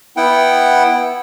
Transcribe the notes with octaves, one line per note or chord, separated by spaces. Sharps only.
B3 E4 F#5 G5